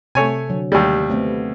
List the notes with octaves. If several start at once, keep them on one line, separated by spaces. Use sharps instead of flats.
C3 A3 C#5 G#5
D3 F#3
D#2 G3 A3
A3 B3 C4